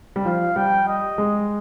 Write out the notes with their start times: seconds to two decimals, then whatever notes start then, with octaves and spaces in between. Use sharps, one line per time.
0.16 G3
0.25 F3 F5
0.56 G3 G5
0.88 D#5
1.18 G#3